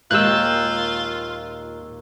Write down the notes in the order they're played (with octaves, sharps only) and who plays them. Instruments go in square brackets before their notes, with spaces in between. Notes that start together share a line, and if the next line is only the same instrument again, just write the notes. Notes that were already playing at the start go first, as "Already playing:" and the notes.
[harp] D#2 G4 G6 [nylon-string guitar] A#2 G#3 [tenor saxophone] F4 [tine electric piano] E6 F#6